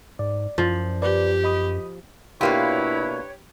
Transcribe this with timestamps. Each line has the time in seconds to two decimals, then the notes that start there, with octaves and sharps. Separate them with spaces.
0.19 G#2 D5
0.58 F#2 F3
1.02 G4 B4 D5
1.44 D#5 B5 D#6
2.41 B2 A#3 D4 E4 F4 G4 B4 C#5